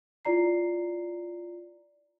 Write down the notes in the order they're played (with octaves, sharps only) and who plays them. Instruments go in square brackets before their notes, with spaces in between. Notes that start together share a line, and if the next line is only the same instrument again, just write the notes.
[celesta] E4 F4 D5 A#5 C7